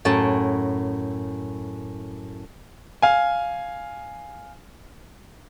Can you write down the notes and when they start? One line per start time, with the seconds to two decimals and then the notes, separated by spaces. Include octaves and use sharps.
0.05 F#2 A2 A5
3.02 F5 G#5